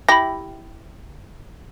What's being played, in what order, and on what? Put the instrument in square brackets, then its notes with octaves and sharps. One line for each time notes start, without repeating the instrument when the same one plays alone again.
[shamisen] E4 G4 [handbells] B5 A#6